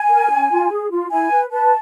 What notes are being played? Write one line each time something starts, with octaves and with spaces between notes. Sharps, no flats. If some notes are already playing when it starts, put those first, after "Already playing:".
Already playing: G#5
A#4
C#4
F4
G#4
F4
E4 G#5
B4
B4 A5